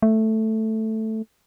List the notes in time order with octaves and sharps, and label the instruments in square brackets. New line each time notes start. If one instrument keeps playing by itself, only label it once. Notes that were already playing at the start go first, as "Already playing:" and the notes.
[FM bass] A3